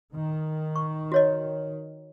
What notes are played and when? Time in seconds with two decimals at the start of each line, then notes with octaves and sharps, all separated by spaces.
0.14 D#3
0.76 C#6
1.12 F#4 C#5 D#5